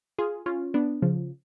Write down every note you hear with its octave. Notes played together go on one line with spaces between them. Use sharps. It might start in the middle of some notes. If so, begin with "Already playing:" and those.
F4 G#4
C#4 F4
B3 D4
C#3 F3